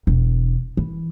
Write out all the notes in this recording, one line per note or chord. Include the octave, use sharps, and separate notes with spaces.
E1
E3